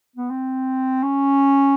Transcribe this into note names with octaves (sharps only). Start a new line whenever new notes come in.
B3
C4
C#4